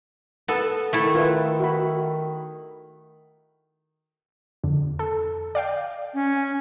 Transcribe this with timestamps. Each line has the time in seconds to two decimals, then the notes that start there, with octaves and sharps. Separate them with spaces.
0.48 B3 A4
0.93 D#3 A3 E4 A4
1.15 F4 B4 E5
1.60 F#4 E5 B5
4.63 F2 D3
4.99 A4
5.55 D5 F5 G5
6.14 C#4